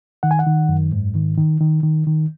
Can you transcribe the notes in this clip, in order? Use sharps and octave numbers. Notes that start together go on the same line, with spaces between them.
D#3 F#5
G#5
F#5
D#3
F#2
G#2
D#3
D#3
D#3
D#3
D#3